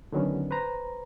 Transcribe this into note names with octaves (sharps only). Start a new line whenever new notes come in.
D3 D#3 F#3 B3 C#4
B4 C5 A#5